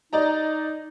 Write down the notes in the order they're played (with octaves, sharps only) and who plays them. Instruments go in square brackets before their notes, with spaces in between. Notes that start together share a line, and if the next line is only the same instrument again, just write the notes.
[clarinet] D#4 [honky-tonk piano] D5 D#5 A#5